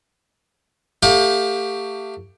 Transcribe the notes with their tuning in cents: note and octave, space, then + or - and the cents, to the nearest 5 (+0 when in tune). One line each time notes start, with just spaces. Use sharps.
A3 +30 G4 +10 F5 +35